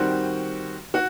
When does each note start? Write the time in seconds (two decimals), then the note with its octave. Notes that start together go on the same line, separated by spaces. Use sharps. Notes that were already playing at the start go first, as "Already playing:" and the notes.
Already playing: D#3 G3 C4 F#4
0.94 F#4